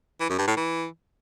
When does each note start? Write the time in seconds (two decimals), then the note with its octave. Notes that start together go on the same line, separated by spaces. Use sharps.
0.21 E3
0.30 F#2
0.39 G2
0.48 A2
0.57 E3